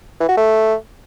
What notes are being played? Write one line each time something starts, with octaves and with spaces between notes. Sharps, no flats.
E3
F#4
A3